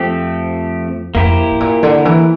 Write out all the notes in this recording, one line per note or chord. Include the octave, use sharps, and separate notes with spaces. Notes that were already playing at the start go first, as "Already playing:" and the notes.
Already playing: F2 F3 A3 C4 G4
F2 A#3 E4 G4 C5
A2
A#2
D3
E3